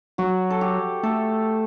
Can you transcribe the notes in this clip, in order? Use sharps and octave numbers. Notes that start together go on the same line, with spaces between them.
F#3 F#4
A4
G4
A3 A4